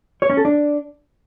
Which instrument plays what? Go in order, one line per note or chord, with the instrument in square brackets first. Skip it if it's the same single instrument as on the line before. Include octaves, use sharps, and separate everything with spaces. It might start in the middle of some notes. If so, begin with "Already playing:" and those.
[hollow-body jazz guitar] C#5
C#4
A4
D4